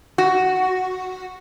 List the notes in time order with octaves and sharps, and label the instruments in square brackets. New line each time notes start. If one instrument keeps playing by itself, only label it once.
[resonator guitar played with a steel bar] F#4